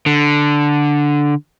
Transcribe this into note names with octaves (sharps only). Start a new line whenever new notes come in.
D3